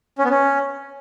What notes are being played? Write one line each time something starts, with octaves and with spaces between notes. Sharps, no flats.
C#4
B3
C#4